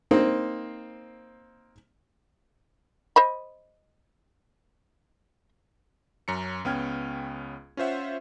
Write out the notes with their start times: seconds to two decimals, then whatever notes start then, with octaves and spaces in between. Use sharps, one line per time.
0.11 A#3 C4 D#4 C5
3.16 C5 D#5 B5
6.28 F#2 C#4 A#5 C#7
6.65 C#2 B3 C#4 G5 F6 G#6
7.77 C#4 F4 C5 E5 F#5